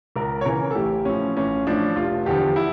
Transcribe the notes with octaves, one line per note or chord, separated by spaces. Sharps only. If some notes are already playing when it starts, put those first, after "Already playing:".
C#2 A#4
C#5
C#3 E3 A#4
A4
A1 G4
A2 F3 C#4
A1 C#4
A2 F3 D4
F1 F4
E2 D3 F3 G4
E4